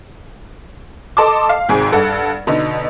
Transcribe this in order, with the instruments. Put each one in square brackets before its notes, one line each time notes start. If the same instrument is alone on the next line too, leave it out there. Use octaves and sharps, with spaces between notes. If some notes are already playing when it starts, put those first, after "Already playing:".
[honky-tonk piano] A4 D#5 A5 C6 D6
F5
G#1 G#2 C3 G#4
G2 A4 F#5
B2 D3 D#4